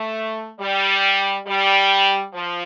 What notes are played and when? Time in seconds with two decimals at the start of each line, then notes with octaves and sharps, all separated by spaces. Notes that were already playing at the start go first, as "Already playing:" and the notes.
Already playing: A3
0.60 G3
1.47 G3
2.33 F3